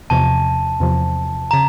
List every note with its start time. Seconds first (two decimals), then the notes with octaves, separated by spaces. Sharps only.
0.10 E2 C3 F3 A5
0.80 E2 C3 F3
1.51 C#3 A#5